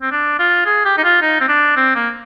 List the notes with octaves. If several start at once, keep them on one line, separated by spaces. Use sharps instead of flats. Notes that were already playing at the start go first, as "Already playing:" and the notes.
C4
D4
F4
G#4
G4
D#4
F4
D#4
C4
D4
C4
A#3